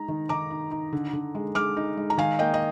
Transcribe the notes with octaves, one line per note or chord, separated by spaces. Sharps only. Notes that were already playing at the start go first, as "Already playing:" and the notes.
Already playing: G#3 D#4 A#5
D#3
D#3 A#5 D6
D#4
D#4
D3
D3
G#3
G#3 D6 F6
D#4
G#3
A#5
D#3 F5 G#5
A#3 D#5 G5
D#5